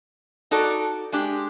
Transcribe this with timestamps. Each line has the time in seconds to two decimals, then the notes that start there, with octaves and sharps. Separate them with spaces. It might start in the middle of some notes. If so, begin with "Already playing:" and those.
0.51 D#4 F#4 A4 D5
1.12 G#3 D4 G4